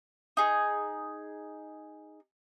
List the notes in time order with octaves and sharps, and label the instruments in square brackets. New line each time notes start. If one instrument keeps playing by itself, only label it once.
[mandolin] D#4 G#4